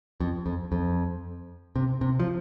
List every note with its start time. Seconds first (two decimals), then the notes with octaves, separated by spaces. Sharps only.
0.20 F2
0.46 F2
0.72 F2
1.76 C3
2.01 C3
2.20 F3